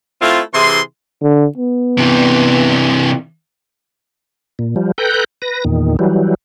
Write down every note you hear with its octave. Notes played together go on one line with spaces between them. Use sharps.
A3 C4 E4 F4
C3 E3 E4 G#4 C6
D3
B3
C3 E3
A#2
F3 G3
A4 B4 G5 A#5 F#6 G6
B4 A#6
E2 A#2 D#3
E3 F#3 G3